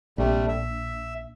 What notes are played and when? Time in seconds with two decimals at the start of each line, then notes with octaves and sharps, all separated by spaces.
0.18 A#1 C3 G3 A3
0.48 E5